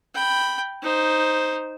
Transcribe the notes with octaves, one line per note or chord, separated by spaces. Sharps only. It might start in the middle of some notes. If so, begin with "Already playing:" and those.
G5 B5
D#4 C5